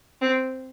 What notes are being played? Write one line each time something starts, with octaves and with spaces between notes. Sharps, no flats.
C4